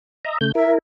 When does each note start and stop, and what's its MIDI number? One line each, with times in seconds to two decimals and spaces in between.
0.25 0.38 75
0.25 0.38 76
0.25 0.38 82
0.41 0.52 49
0.41 0.52 57
0.41 0.52 91
0.55 0.78 64
0.55 0.78 70
0.55 0.71 76